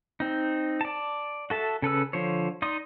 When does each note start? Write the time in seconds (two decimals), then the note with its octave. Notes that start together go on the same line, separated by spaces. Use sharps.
0.20 C4 D#4
0.81 D5 A5
1.50 F#4 A4 E5 A5
1.82 C#3 A4 B4 E6
2.13 D3 F3 C5 C#5
2.62 D#4 D5 D#5 C6 D#6